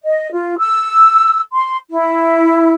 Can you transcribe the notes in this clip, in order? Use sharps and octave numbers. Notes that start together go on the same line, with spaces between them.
D#5
F4
E6
C6
E4